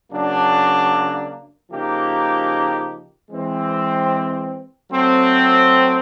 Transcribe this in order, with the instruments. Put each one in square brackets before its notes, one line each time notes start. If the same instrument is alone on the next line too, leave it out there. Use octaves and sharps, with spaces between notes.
[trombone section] C#3 F#3 A#3 D4
C#3 F3 A#3 D#4 G4
E3 G#3 C4
F#3 A3 C4